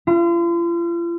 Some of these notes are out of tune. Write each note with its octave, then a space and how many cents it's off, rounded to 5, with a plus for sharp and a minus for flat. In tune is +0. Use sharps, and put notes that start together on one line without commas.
F4 -40